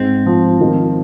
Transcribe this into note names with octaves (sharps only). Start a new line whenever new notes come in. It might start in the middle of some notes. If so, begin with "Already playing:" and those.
Already playing: G#2 C4
F3
D#3